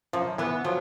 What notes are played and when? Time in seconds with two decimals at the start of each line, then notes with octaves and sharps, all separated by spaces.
0.13 F#2 F3
0.38 E3 B3
0.64 F3 F#3